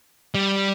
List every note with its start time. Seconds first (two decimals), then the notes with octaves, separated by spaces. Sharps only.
0.35 G3